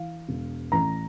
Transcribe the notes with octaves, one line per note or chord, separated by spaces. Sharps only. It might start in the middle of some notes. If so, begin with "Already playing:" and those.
Already playing: E3 F5
E1
A1 A#5